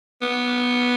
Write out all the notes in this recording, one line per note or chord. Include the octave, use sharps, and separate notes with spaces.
B3